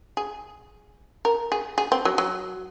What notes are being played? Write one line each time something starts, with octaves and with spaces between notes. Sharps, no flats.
G#4
A#4
G#4
G#4
C4
F#3
F#3